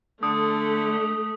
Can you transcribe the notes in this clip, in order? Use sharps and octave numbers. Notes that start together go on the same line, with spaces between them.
D3 A3 D#6